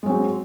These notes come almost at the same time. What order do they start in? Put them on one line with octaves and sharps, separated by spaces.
G#3 F#3 C4